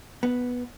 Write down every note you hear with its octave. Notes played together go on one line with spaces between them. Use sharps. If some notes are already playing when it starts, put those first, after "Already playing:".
B3